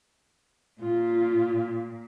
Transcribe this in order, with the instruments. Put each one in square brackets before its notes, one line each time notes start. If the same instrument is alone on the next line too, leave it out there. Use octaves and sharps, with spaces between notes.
[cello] A#2 [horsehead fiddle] F4